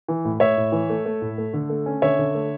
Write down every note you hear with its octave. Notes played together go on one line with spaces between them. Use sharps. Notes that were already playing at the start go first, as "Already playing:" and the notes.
E3
A2
A2 C#5 E5
A2
E3
A3
A3
A2
A3
D3
A3
C#4
D3 C#5 E5
D3
A3